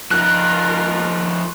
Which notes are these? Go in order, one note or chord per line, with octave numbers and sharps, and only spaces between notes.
F3 D#4 F4 A#4 F#6